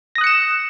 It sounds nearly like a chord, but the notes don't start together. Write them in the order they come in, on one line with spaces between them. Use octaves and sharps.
A#6 D#6 F#6 C#7 E7